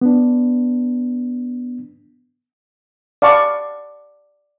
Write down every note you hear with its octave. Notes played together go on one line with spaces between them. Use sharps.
B3 D4
D5 F5 F#5 A5 B5 C#6